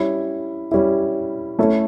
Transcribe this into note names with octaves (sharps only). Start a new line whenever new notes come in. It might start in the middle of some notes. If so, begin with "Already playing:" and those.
Already playing: G3 C#4 E4
G3 C#4 E4
A3 C#4 E4 A4